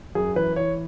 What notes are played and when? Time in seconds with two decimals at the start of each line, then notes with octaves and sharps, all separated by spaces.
0.15 F#2 G#4
0.36 E3 B4
0.56 E3 C#5